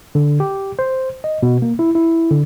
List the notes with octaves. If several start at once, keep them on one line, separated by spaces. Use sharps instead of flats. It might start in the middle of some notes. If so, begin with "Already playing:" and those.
D3
G4
C5
D#5
B2
A#3
E4
E4
D3